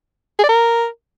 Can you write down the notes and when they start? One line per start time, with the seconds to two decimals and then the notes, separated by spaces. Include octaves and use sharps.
0.39 G#4
0.44 D5
0.49 A#4